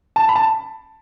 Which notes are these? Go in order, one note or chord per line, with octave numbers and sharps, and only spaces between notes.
A5
B5
A5